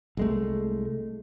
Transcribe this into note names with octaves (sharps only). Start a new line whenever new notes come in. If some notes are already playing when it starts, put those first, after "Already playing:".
C2 G#3 A3